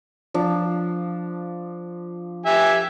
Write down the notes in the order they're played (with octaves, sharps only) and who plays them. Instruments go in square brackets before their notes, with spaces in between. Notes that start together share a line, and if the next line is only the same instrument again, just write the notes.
[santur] F3 D4
[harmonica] G4 E5 G#5